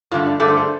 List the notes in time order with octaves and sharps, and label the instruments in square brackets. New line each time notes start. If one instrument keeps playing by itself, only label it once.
[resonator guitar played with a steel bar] G2 D3 A3 [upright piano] F4
[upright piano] D4
[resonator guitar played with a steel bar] G2 D3 A3 [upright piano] A4
[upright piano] C5
A4